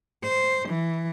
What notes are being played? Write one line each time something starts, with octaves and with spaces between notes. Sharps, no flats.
C5
E3